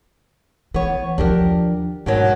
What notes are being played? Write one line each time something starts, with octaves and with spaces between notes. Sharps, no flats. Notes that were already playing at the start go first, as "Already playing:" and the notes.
E3 B3 C#5
D#2 F3 D4 G4 A#4
G#2 B2 D#3 F#3